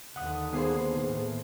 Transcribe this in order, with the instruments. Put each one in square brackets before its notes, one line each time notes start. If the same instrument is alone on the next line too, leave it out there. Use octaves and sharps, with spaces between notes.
[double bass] D#2 D3 [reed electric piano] F#5 D#6
[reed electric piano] D#3 A#3 C5 [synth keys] B3 G#4 C7
[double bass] A2